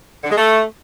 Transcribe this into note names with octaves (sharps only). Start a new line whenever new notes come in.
D3
G#3
A3